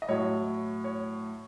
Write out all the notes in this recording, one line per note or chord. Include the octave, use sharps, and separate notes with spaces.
D#5
A2 F#3 C#5
C#5